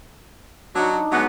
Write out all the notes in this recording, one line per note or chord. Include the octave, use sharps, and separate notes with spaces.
F#3 D4 D#4 F#4
F#3 G#3 B3 F#4